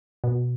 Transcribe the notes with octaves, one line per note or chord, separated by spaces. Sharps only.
B2